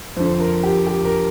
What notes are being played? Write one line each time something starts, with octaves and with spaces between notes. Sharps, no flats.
F2 D3 C5
A#4
G4
G4
A#4